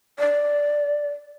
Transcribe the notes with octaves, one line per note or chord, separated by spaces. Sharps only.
D5